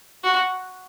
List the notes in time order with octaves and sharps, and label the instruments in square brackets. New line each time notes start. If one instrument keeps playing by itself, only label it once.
[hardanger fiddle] F#4